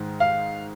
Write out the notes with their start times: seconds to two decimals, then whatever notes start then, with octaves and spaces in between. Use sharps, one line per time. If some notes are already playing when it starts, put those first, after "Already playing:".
Already playing: G#2 D#3 G#3
0.20 F5